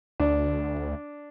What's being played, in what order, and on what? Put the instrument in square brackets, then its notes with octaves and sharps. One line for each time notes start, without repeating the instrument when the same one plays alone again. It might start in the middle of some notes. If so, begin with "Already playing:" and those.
[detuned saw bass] D2 [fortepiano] D4